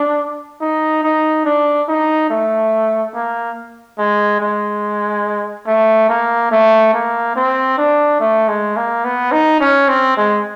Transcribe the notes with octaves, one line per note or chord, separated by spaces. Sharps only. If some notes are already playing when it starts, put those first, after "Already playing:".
Already playing: D4
D#4
D#4
D4
D#4
A3
A#3
G#3
G#3
A3
A#3
A3
A#3
C4
D4
A3
G#3
A#3
B3
D#4
C#4
C4
G#3